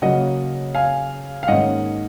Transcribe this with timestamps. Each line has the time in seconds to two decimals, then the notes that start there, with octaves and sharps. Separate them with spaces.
0.02 C#3 F#3 A#3 C#4 D#5 F#5
0.75 F5 G#5
1.43 F5
1.48 G#2 D#3 A#3 C#4 D#5 F#5